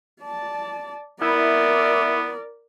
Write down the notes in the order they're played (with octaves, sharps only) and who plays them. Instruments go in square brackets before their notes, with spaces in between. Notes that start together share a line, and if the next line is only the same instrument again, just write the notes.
[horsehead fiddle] D5 A5
[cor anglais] B3 [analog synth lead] E4 [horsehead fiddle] A#4 D5